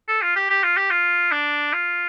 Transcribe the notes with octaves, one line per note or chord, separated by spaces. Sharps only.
A4
F4
G4
G4
F4
G4
F4
D4
F4